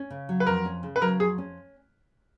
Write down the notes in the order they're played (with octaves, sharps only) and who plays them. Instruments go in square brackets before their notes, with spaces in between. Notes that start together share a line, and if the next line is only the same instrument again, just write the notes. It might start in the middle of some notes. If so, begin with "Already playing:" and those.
Already playing: [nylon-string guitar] C#4
C#3
F#3
[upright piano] B4
[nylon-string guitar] F2 [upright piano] A#4
[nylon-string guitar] C#4
C#3
[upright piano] B4
[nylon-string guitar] F#3 [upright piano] A#4
[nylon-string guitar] F2 [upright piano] G#4
[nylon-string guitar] C#4